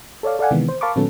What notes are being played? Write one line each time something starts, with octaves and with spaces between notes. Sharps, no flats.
A4 C#5 D5 F5
A4 D5 F5 F#5 G#5
C3 D#3 E3 G#3 B3
C5
A#4 F5 A5 B5 C#6 D6
A#2 D#3 F#3 B3 C#4 A4